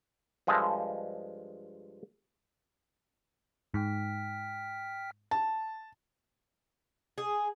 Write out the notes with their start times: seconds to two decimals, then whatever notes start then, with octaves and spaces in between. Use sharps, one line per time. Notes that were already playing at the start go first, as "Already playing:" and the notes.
0.47 G2 F3 G#3 A4 D#5 E5
3.74 G#2 G5 F6 B6
5.31 A5
7.18 G#4